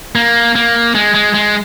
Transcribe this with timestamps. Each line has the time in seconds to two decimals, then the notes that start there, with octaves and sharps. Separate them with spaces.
0.15 A#3
0.56 A#3
0.95 G#3
1.14 G#3
1.34 G#3